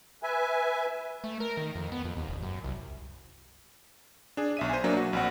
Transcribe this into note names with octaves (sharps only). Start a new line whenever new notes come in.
B4 E5 G#5
A3
A#4
D#3
F2
B3
F2
D#2
E1
F#2
C2
D4 G#4
B1 E5 D#7
C5 G#5
F#3 A#3 D4
F#4
A#1 C4 F#5